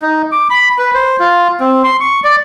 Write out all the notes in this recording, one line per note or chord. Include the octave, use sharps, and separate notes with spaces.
D#4
D6
B5
B4
C5
F4
C4
C6
C#6
D5